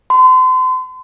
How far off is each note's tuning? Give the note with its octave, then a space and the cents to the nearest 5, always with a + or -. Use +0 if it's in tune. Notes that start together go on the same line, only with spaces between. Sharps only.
C6 -40